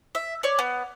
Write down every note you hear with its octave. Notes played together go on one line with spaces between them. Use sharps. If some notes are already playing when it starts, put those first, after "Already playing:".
E5
C#5 D5
B3